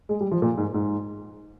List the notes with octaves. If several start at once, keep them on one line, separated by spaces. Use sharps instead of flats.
G#3
G3
F3
A#2
G#2
G#2